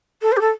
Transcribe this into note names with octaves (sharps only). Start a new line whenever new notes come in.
A4
C5
G4
A4